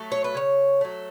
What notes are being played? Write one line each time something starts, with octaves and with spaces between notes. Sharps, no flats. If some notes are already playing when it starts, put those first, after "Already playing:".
Already playing: F#3 A3
C#5
B4
C#3 C#5
F#3 A3